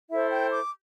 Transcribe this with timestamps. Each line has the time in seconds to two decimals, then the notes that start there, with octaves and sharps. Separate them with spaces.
0.10 E4 A4 C5 E5
0.30 G5
0.51 D6